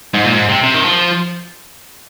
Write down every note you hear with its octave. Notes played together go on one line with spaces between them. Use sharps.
G#2
A#2
G#2
C3
C3
D#3
F3